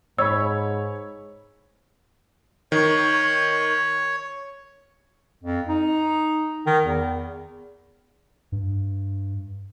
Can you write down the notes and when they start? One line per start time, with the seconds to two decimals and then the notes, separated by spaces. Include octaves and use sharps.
0.18 G#2 C#5 B5 E6
2.72 D#3 C#5
5.43 F2
5.68 D#4
6.66 D#3
6.83 E2
8.52 G2